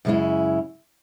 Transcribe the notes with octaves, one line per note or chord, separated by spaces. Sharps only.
F#2 C#3 G#3 C#4 E4